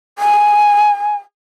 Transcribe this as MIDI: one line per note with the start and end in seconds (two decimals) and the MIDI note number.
0.19 1.18 80